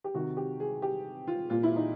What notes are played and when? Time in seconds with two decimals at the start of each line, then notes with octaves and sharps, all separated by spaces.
0.04 G4
0.15 C3 D#3 F#4
0.37 G4
0.60 G#4
0.82 G4
1.27 F4
1.50 A#2 F4
1.63 E4
1.76 D#4